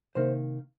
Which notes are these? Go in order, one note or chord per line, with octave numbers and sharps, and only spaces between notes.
C3 D#3 A#3 C5